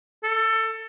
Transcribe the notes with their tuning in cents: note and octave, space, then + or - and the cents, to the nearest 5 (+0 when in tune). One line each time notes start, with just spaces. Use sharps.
A4 +20